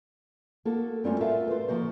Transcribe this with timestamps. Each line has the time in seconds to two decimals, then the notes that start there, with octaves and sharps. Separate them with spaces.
0.65 A#3 F#4 A4
1.04 F#2 G3 A3 C#4 F4 C5
1.20 F4 F#4 A4 A#4 E5 F5
1.48 B4 C5
1.68 F3 A#3 F#4 C5